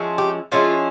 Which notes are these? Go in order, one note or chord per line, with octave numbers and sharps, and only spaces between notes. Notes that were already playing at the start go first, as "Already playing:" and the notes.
Already playing: F3 G#3 C#4 E4
G4
F3 G#3 C#4 E4 F4